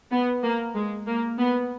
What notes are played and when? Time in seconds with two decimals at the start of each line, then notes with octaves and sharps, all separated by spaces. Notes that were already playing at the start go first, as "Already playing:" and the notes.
0.12 B3
0.44 A#3
0.76 G#3
1.08 A#3
1.39 B3